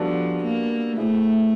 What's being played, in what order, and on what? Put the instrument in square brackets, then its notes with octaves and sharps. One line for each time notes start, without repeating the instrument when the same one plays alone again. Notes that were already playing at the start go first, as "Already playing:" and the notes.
Already playing: [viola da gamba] F3 [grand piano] G3 B3 D4 F#4 A4
[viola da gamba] A#3
[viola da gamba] A3 [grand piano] B3 E4 G#4 C5